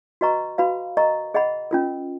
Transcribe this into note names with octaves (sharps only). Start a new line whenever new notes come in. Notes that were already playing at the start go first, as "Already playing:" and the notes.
F#4 B4 D#5 A#5 C#6
F#4 B4 F5 B5
A#4 D#5 A#5 C#6
G#4 D#5 F#5 B5
C#4 F4 A#4